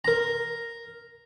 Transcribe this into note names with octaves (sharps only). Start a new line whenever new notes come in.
A#4 A#5